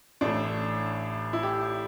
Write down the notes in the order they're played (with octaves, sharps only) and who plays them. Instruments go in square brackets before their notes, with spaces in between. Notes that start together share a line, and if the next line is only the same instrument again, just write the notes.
[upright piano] A1 A2 A3 D4
E4
G4